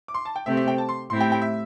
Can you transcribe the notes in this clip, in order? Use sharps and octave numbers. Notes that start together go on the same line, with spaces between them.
D6
C6
A5
G5
C3 A3 C4 G4 E5
E5
G5
A5
C6
A2 A3 C4 E4 G4 C6
G5
G5
E5